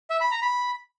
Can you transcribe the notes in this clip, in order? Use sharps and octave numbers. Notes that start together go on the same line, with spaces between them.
E5
B5
A#5
B5